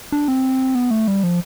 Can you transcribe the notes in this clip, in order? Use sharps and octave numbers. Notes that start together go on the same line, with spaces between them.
D4
C4
B3
A3
G3
F3